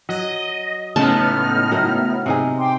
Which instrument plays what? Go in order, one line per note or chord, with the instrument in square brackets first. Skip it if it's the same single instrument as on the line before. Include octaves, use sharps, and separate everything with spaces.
[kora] F#3 [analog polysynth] D#5
[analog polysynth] A2 B3 [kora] C#3 G#3 [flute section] D#4 F6 [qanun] A5
[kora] F#3 A#4 E5
C3 D#4 G#4
[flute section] G5 C6 D6